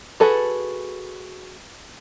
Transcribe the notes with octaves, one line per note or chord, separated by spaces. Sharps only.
F#4 G#4 A4 B4